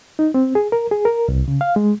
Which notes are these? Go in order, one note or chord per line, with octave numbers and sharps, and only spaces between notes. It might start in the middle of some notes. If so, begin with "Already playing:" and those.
D#4
C4
G#4
A#4
G#4
A#4
C2
C#3
F5
G#3